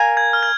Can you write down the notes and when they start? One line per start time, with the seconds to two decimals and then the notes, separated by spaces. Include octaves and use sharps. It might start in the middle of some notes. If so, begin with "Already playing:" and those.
Already playing: A#4 F5 G#5
0.17 G#6
0.33 F6
0.43 G#6